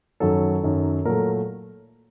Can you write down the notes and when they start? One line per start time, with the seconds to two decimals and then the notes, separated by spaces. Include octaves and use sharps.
0.20 F#2 D#3 F#3 A4
0.63 F#2 D#3 F#3
1.05 A#2 F#3 A3 A#4